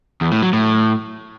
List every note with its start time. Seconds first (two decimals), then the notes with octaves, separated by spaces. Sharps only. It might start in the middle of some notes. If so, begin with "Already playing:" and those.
0.21 E2
0.32 A2
0.42 F#3
0.53 A2